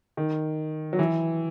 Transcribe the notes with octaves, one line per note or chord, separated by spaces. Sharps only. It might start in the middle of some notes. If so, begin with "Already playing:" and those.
D#3
F#3
E3